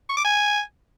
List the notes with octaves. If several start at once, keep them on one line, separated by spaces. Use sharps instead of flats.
C#6
D6
G#5